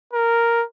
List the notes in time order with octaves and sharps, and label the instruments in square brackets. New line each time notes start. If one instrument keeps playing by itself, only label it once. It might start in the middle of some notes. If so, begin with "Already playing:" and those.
[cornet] A#4